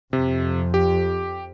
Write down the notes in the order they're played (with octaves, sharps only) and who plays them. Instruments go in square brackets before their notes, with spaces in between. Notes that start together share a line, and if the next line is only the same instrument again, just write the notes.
[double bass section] F2 [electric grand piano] C3
[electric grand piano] G4